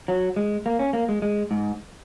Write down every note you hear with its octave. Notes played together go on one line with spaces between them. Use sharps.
F#3
G#3
A#3
C#4
A#3
G#3
G#3
G#2